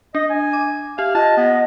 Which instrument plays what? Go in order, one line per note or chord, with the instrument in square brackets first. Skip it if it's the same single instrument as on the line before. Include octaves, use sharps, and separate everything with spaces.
[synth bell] D4 [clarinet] D#5
[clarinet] G#5
[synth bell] D6
[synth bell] G4 E5 [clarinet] F5
[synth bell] F4 [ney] D#5 [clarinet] A5
[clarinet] B3